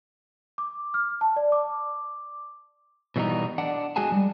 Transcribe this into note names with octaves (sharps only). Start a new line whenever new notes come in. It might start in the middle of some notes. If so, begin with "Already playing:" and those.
D6
F6
A5
D5
D6
B2 E3 G3 B3 D#4
D4 F#5
G#3 F#4 G#4 G#5 A5
G3